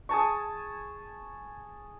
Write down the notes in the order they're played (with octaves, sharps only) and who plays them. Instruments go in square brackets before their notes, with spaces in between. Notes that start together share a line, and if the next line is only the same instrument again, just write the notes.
[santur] G#4 G#5 A5 C#6